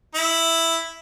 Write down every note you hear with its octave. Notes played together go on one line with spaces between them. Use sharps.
E4